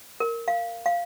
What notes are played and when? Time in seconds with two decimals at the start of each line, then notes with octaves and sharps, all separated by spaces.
0.20 A#4
0.48 F5
0.86 F5